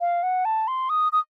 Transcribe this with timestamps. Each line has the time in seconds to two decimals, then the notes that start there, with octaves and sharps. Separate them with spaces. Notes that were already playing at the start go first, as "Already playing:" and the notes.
0.01 F5
0.23 F#5
0.45 A5
0.68 C6
0.90 D#6
1.12 D#6